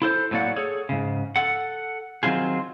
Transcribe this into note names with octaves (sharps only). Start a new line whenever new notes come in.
E4 A4 C5
A2 F#3 A3 A#3 D5 F#5
G#4 A4 C#5
G#2 C#3
A4 F#5
D#3 F#3 C4 F4 G#4